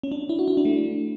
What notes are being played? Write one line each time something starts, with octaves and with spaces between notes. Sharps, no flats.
C#4
D4
E4
F#4
E4
D4
A3